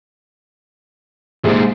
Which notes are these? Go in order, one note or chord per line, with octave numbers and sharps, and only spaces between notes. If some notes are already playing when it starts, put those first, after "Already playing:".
A#1 E2 G#2 C3 G#4